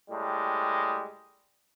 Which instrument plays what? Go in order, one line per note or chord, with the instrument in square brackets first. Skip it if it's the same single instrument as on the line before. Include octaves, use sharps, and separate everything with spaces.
[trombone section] A2 G3 G#3